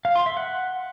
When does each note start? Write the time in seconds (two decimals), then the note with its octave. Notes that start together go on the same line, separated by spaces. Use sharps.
0.05 F5
0.15 C6
0.26 E5
0.37 F#5